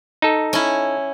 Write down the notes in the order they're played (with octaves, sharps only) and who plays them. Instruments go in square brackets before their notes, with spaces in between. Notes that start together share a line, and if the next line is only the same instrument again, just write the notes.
[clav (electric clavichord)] D#4 A4
[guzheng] C#4 E4